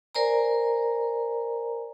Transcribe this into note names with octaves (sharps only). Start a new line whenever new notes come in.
A#4 C5 D5 G#5 A#5